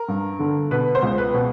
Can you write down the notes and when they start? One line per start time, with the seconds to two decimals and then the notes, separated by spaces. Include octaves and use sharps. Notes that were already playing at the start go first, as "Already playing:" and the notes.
Already playing: A#4
0.08 G2
0.39 D3
0.71 B2 B4
0.95 C5
1.02 C#2
1.18 B4
1.34 B2